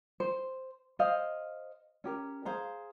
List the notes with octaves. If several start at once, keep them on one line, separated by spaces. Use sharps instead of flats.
C5
C5 C#5 D#5 F5
C#4 G4 A#4
G#4 C5 F5 A#5